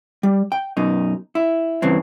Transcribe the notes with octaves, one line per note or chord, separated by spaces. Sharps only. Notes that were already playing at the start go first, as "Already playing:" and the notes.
G3
G5
F#2 B2 D#4
E4
G2 C#3 E3 C4